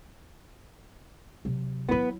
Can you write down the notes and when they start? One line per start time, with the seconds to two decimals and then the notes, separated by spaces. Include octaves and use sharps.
1.45 C3 F#3
1.89 F#3 B3 E4 B4